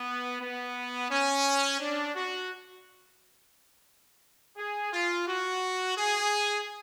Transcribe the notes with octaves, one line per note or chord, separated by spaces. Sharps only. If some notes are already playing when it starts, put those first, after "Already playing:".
Already playing: B3
B3
C#4
D4
F#4
G#4
F4
F#4
G#4